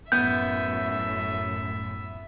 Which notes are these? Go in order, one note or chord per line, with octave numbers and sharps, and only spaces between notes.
F#2 A2 B3 E5 G6